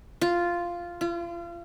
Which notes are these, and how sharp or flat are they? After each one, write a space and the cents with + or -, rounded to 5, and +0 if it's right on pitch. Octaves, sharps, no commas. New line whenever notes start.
F4 -5
F4 -35